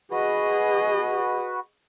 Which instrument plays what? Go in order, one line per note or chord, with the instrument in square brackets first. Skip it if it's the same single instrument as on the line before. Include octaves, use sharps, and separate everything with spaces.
[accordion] F#4 B4 [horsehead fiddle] G#4 D#5